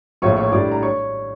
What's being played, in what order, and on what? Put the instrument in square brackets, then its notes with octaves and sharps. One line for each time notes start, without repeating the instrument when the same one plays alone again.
[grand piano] A#1 A2 F3 A#3 E4 C#5 C#6
C#5 C#6
A2 G3 D4 D5 D6
A#5
C#5 C#6